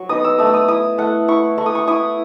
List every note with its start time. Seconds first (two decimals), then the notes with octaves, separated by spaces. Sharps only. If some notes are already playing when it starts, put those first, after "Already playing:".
Already playing: F#3 C#6
0.09 B3 D#4 D#6
0.24 E6
0.38 A3 D#6
0.46 E6
0.54 D#6
0.68 E4 D#6
0.98 A3 F#5
1.28 E4 C#6
1.58 A3 C#6
1.66 D#6
1.75 C#6
1.87 E4 D#6